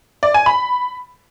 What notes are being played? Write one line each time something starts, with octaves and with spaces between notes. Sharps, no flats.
D5
G#5
B5